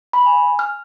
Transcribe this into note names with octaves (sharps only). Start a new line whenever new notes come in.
B5
G#5
F6